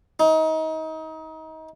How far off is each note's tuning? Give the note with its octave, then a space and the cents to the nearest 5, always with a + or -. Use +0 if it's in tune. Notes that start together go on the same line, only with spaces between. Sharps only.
D#4 +30